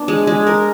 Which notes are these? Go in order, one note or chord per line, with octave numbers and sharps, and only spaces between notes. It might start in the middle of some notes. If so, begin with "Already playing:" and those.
Already playing: B3 D4
G#3
G#3
A#4